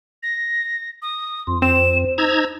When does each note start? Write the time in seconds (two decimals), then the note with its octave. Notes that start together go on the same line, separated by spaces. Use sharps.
0.23 A#6
1.02 D#6
1.47 F2 C6
1.62 C4 C5 E7
2.18 D#4 A#5 E6 G#6